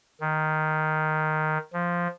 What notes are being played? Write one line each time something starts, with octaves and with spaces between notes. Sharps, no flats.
D#3
F3